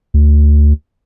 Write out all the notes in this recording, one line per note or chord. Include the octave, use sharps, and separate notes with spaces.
D2